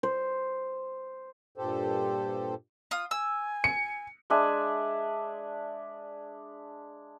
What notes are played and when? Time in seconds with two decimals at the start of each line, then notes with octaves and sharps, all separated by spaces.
0.03 C5
1.58 G2 A#2 G4 A4 C5
2.91 F4 D#6
3.11 G#5 E6
3.64 C#7
4.30 G#3 D4 E5 G#5